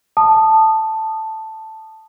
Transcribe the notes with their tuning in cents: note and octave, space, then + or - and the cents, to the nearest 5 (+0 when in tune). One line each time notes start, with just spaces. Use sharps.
A5 +0 D#6 -15